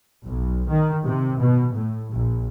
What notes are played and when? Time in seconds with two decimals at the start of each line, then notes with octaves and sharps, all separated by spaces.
0.25 B1
0.68 D#3
1.05 C3
1.41 B2
1.76 A2
2.14 A#1